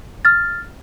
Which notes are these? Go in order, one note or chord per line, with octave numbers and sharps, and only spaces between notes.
F6 A6